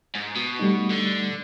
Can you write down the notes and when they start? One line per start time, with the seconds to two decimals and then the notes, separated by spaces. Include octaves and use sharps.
0.15 G#2
0.36 B2
0.59 G3 A3 D#4
0.91 D3